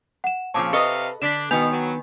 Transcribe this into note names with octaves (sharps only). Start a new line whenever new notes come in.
F#5 E7
A#2 C#3 F3 C4 C#5 A5 D6
C3 A4 B4 D#5 F5 C#6 C#7 G7
D3 D4 B6 E7
G#2 B2 D#3 B3 G#5 G6 F7
F#3